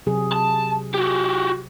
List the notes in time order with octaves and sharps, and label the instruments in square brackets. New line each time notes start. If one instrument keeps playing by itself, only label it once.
[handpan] C3 F#3 G#4
[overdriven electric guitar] A5
F#4 G4